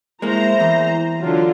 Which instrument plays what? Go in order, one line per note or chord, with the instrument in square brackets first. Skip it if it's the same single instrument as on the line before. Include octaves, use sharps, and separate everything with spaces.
[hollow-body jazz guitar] G#3 A#3 [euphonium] E4 [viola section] C5 A#5
[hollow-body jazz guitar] E2
[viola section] D3 F4 [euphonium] F#3